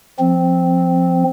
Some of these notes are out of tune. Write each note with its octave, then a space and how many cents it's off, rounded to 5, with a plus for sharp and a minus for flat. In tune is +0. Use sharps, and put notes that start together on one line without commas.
F3 +0 C4 +0